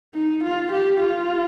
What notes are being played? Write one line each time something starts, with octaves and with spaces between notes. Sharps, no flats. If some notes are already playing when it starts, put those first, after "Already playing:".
D#4
F4
G4
F4